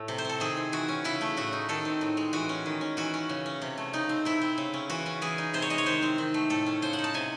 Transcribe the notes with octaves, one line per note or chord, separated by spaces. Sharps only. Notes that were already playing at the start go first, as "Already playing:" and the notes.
Already playing: A2 A3 A4
C3
C5
C4 A4
D#3 G#4
C4
E3 F#4
C#4
C#3 E4
A3
A2 F#4
D#4
D#3 A4
C4
A2
G#3
E3 F#4
C#4
D#3
C#4
E3 F#4
C#4
C#3
C#4
C3
A3
C#3 D#4
C4
C3 E4
C4
C#3
C#4
E3 F#4
C#4
E3 G#4
D#4
C3 C5
C#5
G#3 D#5
C#5
D#3 C5
C4
D#3
A3
A2 A4
C#4
C#3 C5
F#5
D#4
A5
C3 G#5